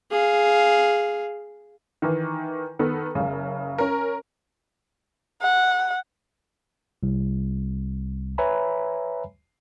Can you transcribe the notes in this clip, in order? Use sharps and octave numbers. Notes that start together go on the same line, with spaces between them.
G#4 F5
D#3 E3
D#3 B3 A4
F#1 C#3
C#4 A#4
F#5
C2
B4 C#5 E5 G#5 A#5 B5